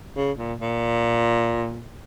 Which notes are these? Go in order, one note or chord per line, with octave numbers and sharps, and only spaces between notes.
C#3
A#2
A#2